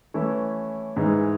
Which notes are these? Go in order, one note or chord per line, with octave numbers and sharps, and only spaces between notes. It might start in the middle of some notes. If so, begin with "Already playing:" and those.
E3 A3 C#4 E4
G#2 E3 G#3